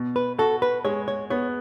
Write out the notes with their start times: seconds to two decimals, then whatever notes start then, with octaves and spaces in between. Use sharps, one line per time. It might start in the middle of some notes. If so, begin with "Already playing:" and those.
Already playing: B2
0.16 B4
0.38 F#4 A4
0.62 B4
0.85 G#3 C#5
1.08 C#5
1.30 B3 C#5